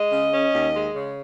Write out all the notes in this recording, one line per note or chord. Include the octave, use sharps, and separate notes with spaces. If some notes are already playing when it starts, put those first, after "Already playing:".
Already playing: G#3 D#5
C#3
C#4
D#2
G#3
C#3